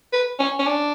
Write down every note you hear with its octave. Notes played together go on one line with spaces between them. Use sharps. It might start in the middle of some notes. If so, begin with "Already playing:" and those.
B4
C#4
C#4
D4